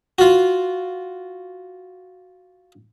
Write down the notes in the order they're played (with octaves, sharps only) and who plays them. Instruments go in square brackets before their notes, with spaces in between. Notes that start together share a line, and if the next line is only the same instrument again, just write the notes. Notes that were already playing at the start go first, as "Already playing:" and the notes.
[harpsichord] F4 F#4